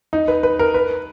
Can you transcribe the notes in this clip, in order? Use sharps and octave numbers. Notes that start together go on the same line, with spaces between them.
D#4
B4
B4
A#4
B4